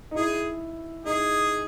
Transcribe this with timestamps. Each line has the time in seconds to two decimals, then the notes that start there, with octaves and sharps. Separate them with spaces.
0.11 D#4
0.15 E4 G#4
1.06 D#4 G#4